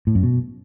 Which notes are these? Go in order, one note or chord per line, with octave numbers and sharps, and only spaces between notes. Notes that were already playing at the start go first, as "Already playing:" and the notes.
A2
F#2
B2